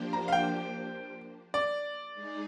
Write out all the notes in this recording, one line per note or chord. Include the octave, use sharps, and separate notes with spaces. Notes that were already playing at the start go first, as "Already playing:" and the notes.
Already playing: F3 A#3 D4 G4 C5
A#5
F5
G5
D5
G#3 D#4 G#4